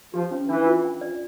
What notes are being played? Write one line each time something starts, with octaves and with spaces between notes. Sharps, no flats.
F3 G4
C#4
E3 D4
F4
G5
D5